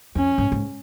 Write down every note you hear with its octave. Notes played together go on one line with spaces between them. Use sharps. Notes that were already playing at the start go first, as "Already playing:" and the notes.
F2 C#4
G#2
G#2